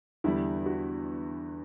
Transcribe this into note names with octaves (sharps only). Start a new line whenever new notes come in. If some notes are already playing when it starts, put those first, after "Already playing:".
E2 D3 G3 E4
F#4